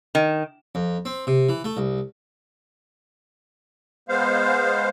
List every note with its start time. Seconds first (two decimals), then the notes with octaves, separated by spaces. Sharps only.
0.15 D#3
0.75 F2
1.05 C4
1.27 C3
1.49 E3
1.64 A3
1.77 C2
4.09 G#3 B3 C5 F5